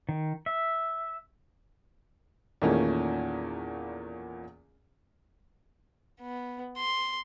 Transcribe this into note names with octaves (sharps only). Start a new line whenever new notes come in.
D#3
E5
E2 A#2 D#3 A3 A#3 C#4
B3
C6